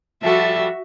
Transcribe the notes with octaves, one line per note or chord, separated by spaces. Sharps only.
F3 G3 F#4 A4 E5